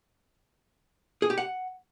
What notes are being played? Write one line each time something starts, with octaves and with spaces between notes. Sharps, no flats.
G#4
G4
F#5